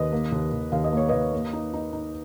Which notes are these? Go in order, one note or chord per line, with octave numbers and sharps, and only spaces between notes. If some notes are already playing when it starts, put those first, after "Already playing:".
Already playing: D#2 B4 D#5
A#3
D#2
D#2
D#2 F5
D#5
A#3 C#5
D#2 B4 D#5
A#3
D#4
D#4
D#4